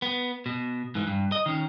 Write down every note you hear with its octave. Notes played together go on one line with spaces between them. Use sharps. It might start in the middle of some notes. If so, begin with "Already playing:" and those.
B3
B2
G#2 E3
G2
D#5
D#3 C#4